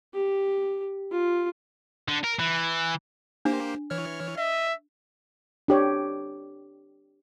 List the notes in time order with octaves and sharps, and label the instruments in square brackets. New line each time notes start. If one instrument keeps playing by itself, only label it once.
[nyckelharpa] G4
F4
[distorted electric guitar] D3
A#4
E3
[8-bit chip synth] A#3 G4 C5 [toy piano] D4
[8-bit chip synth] E3 C#5 F6
[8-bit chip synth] D#5 [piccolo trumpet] E5
[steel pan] D4 G4 C#5